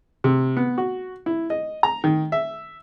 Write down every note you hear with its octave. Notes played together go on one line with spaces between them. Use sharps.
C3
B3
F#4
E4
D#5
A#5
D#3
E5